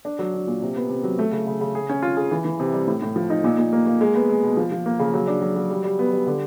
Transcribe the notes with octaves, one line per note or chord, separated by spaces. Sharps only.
D4
F#3
D4
A#2
C3
B3
C3
F#3
A3
C#3
C#3
C#3
G#4
C#4
F4
G#4
E3
E3
C3
G3
A2
A2
F3
D#4
A#2
A#2
A#3
A#3
G#3
B3
G#3
B2
F3
F3
A#3
C#3
F#3
D4
F#3
F#3
G3
G3
B3
G3
D3